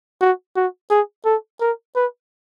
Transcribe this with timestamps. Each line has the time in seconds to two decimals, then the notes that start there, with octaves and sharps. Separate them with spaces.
0.21 F#4
0.56 F#4
0.90 G#4
1.25 A4
1.61 A#4
1.96 B4